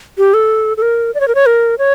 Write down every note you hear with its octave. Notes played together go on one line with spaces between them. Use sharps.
G4
A4
A4
A#4
D5
C#5
A#4
C#5
A#4
C#5